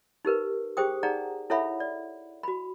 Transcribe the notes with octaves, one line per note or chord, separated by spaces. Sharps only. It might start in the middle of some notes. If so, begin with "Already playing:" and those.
D#4 G4 A#4 B4
G4 G#4 C5 G5 D#6
D#4 G#4 D5 F#5 A#5
E4 A4 C#5 E5 F#5 B5
D5
F#4 B5